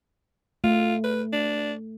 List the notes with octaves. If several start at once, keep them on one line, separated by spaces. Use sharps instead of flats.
A3 F4
B4
D4